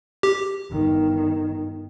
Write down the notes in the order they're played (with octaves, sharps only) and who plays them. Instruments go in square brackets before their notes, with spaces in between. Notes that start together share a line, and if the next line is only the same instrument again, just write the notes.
[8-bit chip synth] G4
[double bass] G1 D#3